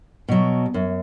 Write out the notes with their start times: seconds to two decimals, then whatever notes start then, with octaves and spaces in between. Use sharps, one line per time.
0.29 B2 F#3
0.74 F#2